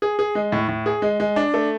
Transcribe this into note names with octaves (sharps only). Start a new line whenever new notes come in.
G#4
G#4
G#3
A2
A2
G#4
G#3
G#3
D4
A3